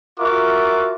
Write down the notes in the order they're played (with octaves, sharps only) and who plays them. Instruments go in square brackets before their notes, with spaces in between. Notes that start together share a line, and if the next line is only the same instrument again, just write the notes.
[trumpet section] F4 F#4 A#4 E5 D6